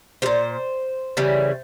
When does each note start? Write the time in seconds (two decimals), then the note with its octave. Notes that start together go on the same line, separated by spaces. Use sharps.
0.22 G3 C5
0.26 A#2
1.17 C#3 E3 G3